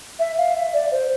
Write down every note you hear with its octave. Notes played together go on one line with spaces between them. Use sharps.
E5
F5
E5
D5
C5